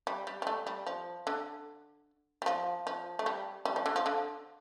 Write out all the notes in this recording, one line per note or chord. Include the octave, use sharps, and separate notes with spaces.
G3
G3
G3
A3
G3
F3
D3
G3
F3
F3
A3
G3
G3
F3
D3
F3
D3